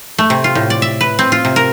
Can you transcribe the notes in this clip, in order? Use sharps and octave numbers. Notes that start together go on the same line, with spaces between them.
A3
C3
F4
A2
D5
E5
B4
C4
F4
C3
A#4